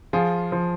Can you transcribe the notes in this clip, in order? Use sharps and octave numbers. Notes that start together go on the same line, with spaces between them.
F3 F4 G#4
F3